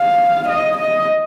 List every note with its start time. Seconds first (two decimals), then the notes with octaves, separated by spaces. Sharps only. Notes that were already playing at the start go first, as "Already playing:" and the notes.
Already playing: F5
0.49 D#5
0.78 D#5